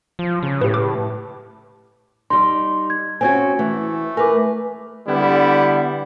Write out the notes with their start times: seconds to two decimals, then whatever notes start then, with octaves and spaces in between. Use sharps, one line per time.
0.19 F3
0.43 C#3
0.61 A2 G4 B4
0.74 D6
2.30 G3 D#4 C6
2.90 G#6
3.21 C4 C#4 F#4 G#5 G#6
3.59 E3 A3
4.17 A#4 B4 G#5 D6
5.08 D3 G3 B3 E4